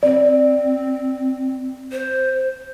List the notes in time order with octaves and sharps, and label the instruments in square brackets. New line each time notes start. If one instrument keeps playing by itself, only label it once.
[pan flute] C4 [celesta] D5
[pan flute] C5